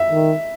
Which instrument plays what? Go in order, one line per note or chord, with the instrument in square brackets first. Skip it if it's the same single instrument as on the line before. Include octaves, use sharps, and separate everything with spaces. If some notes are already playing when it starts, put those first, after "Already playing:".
Already playing: [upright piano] E5
[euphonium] D#3